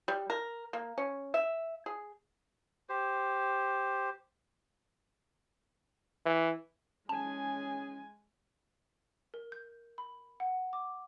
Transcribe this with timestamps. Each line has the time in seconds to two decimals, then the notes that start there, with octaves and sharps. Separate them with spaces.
0.08 G3
0.30 A#4
0.73 A#3
0.98 C#4
1.34 E5
1.86 G#4
2.89 G4 C5
6.25 E3
7.09 G#3 C#4 G#4 G#5 A5
9.34 A#4
9.52 G6
9.98 B5
10.40 F#5
10.73 D6